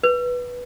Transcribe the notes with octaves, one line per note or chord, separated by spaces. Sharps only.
B4